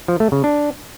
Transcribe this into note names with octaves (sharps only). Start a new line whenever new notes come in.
F3
A3
C#3
D4